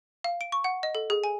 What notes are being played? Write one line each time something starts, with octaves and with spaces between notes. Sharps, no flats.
F5
D7
C#6
F#5
D#5
A4
G#4
G#5